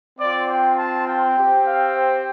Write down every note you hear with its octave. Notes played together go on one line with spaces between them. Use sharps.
C4 F4 D5
G5
A5
G5
C4 G4
F5
C5